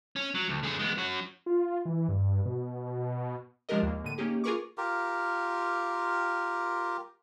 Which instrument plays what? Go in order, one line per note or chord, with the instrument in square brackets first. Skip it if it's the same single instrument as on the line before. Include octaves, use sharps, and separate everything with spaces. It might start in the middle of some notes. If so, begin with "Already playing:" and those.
[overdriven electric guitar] C#4
F#3
D2
D3 G#4
G#3 B3
C#4 F#4
[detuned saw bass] F4
E3
G2
B2
[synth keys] F3 G#3 D4 G4 A#4 D#5
D#2 A#3
A2 D3 D#7
A#3 C#4 D#4 G4 G#4
F4 G#4 A#4 B4 C#6 D6
[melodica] F4 G4 A#4